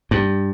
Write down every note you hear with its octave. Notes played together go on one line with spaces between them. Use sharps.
G2